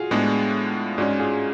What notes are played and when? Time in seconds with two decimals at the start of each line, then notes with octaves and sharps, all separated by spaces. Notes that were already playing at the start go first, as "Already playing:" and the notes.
Already playing: F4 F#4 G#4
0.11 A2 G#3 B3 D4
0.98 G#2 G#3 C#4 D4 F#4
1.19 F4 G#4